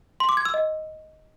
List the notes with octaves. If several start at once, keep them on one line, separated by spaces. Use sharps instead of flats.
C6
D6
G#6
E6
D#5